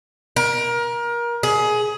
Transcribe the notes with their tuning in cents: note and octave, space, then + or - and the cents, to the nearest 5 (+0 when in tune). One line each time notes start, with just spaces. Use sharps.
A#4 +25
G#4 +20